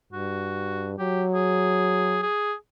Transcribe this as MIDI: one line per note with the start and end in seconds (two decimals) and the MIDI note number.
0.13 0.98 43
0.13 0.93 66
0.98 2.25 54
0.98 1.24 67
1.34 2.21 68
2.22 2.54 68